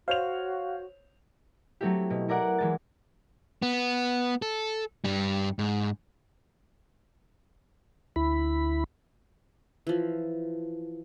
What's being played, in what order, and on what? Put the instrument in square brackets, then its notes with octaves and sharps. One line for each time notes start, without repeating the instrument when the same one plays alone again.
[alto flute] F#4 [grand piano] C5 C#5 F7 [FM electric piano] F5
[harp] F#3 A3 C4 E4 G4
B2
E4 A#4 D5 F#5
E3 G#3 A6
[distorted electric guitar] B3
A4
G2 G3
G#2
[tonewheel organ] D2 E4 B5
[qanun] E3 F3